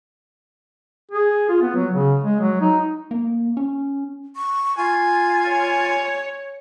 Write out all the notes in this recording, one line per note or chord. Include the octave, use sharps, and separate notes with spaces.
G#4
F4
B3
F#3
C#3
G#3
F#3
D#4
A#3
C#4
C#6
F4 G#5
C#5